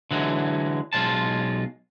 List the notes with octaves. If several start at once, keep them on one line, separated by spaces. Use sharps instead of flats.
D3 E3 F#3 G#3
B1 G#3 F4 A5